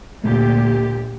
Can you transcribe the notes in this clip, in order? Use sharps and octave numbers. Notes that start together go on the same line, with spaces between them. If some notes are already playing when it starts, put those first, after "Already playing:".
D2 A#2 G4